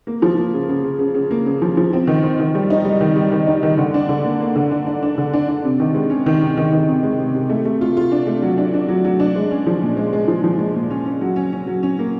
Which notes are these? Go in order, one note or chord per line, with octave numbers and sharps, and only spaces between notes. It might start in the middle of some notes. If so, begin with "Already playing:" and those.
A#3
F3
A#3
C#3
C#3
C#3
C#3
C#3
A#3
C#3
F3
F3
C4
D#3
C4
D#3
G3
D#4
G3
D#3
G3
D#3
D#4
D#3
D3
D4
D3
A#3
A#3
D3
D4
D4
D4
D3
D4
D4
C3
D#3
G#3
C#4
D#3
C3
D#3
D#3
C3
G#3
C3
C3
A3
A3
F4
F4
D4
A3
F#3
D4
D4
F#3
F#3
D4
G#3
C#4
F3
A#2
G#3
G#3
F3
F3
G#3
A#2
C#4
C#4
F#3
C#4
C#4
F#3
C#4
A#3